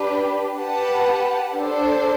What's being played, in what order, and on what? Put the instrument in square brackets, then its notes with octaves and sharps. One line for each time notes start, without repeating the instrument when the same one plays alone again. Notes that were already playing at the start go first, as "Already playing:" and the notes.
Already playing: [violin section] D4 G4 B4
G4 B4 F#5 A5
D4 A4 C5